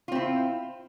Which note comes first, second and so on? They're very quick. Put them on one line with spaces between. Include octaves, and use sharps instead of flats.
F4 C4 E4